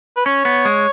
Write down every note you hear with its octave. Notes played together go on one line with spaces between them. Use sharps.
B4
C#4 C#5
B3
G#3